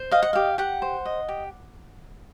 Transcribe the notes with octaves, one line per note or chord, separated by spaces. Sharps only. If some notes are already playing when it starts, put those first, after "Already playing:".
Already playing: C5
D#5 F5
F#5
G4 F5
G4 F#5
C5
D#5
G4